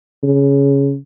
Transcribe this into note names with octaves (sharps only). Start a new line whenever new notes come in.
C#3